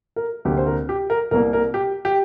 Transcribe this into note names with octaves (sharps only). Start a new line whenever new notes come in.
A#4
D2 C3 A#3 G4
C5
A#4
G4
A#4
C2 C3 A#3 A#4
A#4
G4
G4